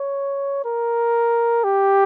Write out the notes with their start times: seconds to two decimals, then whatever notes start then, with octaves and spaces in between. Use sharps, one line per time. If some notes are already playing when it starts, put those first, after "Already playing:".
Already playing: C#5
0.65 A#4
1.64 G4